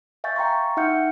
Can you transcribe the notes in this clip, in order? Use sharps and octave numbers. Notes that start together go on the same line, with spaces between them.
E5 F5 G#5 C#6 G6 A6
F5 G5 A#5 C6 C#6
D#4 E5 F#5 F6 G6 C#7